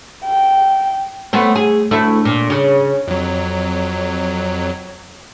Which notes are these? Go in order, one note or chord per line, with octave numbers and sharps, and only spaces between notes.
G5
A3 B3 C4
G#4
D2 A3 E4
A#2
C#3
F2 F#3